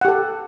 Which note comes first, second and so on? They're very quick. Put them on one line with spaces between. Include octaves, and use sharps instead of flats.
F#5 G4 A4